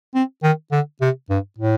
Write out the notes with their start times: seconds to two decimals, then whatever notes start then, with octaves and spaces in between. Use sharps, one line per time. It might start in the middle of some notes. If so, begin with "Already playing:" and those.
0.15 C4
0.43 D#3
0.72 D3
1.01 C3
1.30 G2
1.59 A2